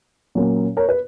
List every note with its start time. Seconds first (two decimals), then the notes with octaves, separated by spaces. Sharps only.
0.35 A#2 F#3 A#3 C#4
0.77 A#4 C#5
0.89 B4